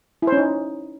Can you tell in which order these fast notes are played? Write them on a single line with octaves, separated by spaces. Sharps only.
E4 C5 C#4 D#4